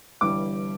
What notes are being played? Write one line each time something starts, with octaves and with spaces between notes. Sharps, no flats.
G1 G2 E3 G3 D6